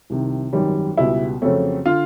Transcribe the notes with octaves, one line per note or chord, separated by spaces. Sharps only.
C2 C3 D#3
G#1 F#2 D#3 G3
C#2 B2 G3 B3 E4
F2 C#3 F#3 A3 C4
D3 F4